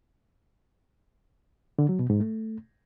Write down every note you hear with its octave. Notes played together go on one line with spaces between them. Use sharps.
D3
F#3
B2
G#2
A3